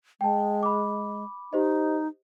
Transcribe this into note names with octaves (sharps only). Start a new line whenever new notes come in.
G#3 G5 A5
B5 D6
D#4 G4 C5 D#5